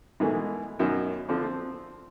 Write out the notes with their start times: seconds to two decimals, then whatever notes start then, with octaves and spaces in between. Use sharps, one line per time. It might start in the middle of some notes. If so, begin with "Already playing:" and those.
0.20 G#2 B2 D#3 E3 G#3 A3
0.79 F#2 B2 D#3 C#4
1.28 D3 F3 C4 D4
1.44 C4